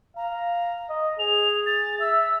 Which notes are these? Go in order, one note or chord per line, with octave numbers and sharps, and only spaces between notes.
F5 A#5
D#5
G#4 F7
A6
E5 E6